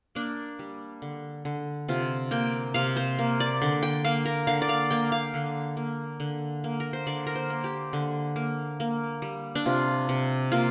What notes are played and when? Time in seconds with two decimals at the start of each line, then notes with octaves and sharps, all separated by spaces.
0.15 A#3 D4
0.59 G3
1.02 D3
1.45 D3
1.89 C3 F4
2.31 A#3 G5
2.74 C3 F5
2.96 C5
3.19 A#3
3.40 D5
3.62 D3
3.83 G5
4.04 A#3 F5
4.25 A#4
4.47 D3 F5
4.62 D5
4.69 F5
4.90 A#3 G5
5.12 F5
5.34 D3
5.77 A#3
6.20 D3
6.64 A#3
6.80 A#4
6.93 C5
7.06 D3 D5
7.27 A#4
7.35 C5
7.50 A#3
7.64 G4
7.93 D3
8.36 A#3
8.80 A#3
9.22 G3
9.55 D4
9.66 C3 F4
10.09 C3
10.52 A#3 F4